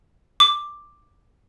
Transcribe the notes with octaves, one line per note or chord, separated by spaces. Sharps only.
D6